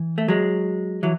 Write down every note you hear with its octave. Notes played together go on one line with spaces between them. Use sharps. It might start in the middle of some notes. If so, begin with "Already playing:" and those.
Already playing: E3
A3
F#3 G#3
E3 F#3